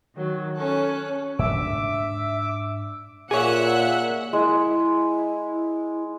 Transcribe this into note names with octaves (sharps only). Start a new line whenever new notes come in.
D#3 F#3
C#4 A4 F#6
G#2 D4 E5 D6 E6
A#2 G#4 C#5 E5 F#5 G#5 F#6
G#3 E4